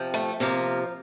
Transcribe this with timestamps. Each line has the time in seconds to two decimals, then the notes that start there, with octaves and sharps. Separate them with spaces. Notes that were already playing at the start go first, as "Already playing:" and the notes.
Already playing: C3 F3
0.14 A3
0.40 C3 F3 A#3